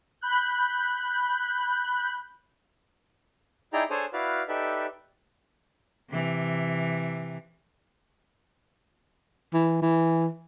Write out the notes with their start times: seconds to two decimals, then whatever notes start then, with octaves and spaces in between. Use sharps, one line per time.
0.21 B5 F#6 G6
3.73 D#4 E4 G#4 D5 G5 A#5
3.90 D4 G#4 A4 C5 C#5 G#5
4.13 E4 F#4 B4 D5 F5 F6
4.48 D#4 G4 A4 B4 D5 E5
6.10 C3 E3
9.53 E3
9.82 E3